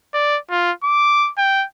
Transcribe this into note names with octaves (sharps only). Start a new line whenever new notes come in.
D5
F4
D6
G5